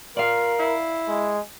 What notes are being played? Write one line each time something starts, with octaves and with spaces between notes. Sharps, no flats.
F4 A#4 D5 F5
E4
G#3